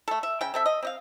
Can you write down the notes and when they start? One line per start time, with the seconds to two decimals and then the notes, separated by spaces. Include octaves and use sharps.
0.08 A3 A4
0.23 E5
0.41 C#3 G5
0.54 C4 A4 E5
0.66 D#5
0.83 C4 D#5 F5